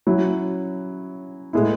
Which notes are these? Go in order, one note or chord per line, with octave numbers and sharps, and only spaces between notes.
F#3 C#4 E4
A2 G#3 B3 E4